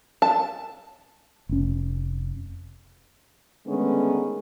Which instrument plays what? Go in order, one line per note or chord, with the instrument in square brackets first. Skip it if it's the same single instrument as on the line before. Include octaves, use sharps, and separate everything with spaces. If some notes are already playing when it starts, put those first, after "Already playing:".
[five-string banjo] A5
[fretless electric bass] F1 C#4
[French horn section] D3 D#3 G#3 A3 B3 C#4